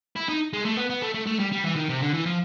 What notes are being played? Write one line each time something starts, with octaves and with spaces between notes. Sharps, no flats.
E4
D#4
G#3
A3
B3
B3
A3
A3
A3
G3
G3
E3
D#3
C3
D3
E3
F3